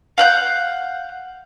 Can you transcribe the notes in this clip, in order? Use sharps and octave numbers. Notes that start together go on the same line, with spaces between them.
F5 F#5 G6